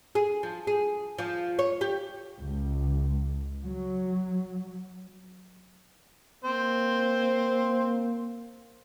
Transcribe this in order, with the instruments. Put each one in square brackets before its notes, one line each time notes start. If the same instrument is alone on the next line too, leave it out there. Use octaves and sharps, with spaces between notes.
[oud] G#4
F3
G#4
F3
C#5
G4
[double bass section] C#2
F#3
[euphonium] A#3 [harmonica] C4 C5